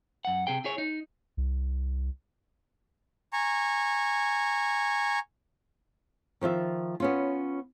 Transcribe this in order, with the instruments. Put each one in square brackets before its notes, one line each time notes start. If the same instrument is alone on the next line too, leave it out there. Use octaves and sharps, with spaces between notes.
[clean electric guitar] F#2 F#5
C3 G#4 G5
E4 G#4 C#5
D#4
[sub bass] C2
[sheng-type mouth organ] G#5 A#5 C#6
[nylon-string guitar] D#3 F3 F4 E5
B3 C#4 F4